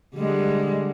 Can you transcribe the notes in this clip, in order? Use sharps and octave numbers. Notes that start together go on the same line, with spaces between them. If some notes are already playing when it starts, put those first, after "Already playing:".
D3 G3 G#3